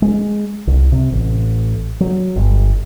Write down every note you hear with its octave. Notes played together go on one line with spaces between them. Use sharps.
G#3
C2
C3
A1
F#3
G1